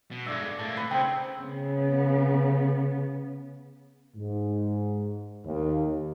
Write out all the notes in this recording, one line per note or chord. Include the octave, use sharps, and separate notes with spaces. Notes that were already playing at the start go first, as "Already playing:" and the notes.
B2
G2 G#3 A3 D5 E5
A2 A#3 A5
B4 F#5
C#3 C4 D#4 G5
C#3 B3
G#2
D#2